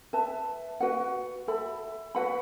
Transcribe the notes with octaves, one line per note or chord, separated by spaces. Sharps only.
B4 E5 A5
F#4 B4 F#5
A4 E5 B5
F#4 B4 F#5 B5